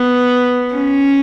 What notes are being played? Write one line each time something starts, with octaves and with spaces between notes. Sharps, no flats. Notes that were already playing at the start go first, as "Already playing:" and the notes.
Already playing: B3
C#4